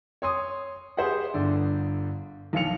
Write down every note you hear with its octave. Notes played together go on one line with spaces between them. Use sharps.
C#5 C6 D#6
G4 G#4 B4 C5 E5 F#5
G1 D3 D5
B1 F3 F4 F5 C#7 F7